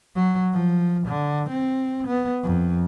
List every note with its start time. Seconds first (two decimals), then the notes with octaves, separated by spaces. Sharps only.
0.15 F#3
0.53 F3
1.07 D3
1.49 C4
2.07 B3
2.43 F2